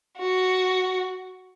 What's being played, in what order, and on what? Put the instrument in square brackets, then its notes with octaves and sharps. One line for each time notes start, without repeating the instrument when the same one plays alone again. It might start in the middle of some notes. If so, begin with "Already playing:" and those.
[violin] F#4